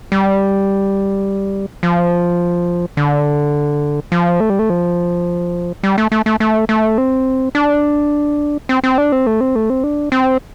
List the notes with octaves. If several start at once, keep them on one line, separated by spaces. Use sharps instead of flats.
G3
F3
D3
F3
A3
G3
A3
F3
G3
A3
A3
A3
A3
A3
C4
D4
C4
C4
D4
C4
A3
C4
A3
C4
D4
C4